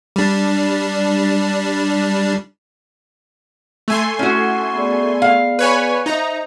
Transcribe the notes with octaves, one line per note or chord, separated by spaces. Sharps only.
G3 D4
A3 G#5 C6
C#4 E4 F#4
B3 G#4 D5
F5
B4 C#5 G#5
D#4 C5 E5 A#5